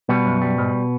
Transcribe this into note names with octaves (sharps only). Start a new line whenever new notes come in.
B2 G3 B3
F#2
G3
G#2